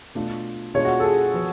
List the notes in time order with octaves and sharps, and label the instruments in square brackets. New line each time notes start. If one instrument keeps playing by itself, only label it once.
[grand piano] B2 A3 D4 F4
[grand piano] B2 G#3 D4 F4 [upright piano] C#5
[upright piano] F#4
A4
G#4
[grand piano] F3 B3 F#4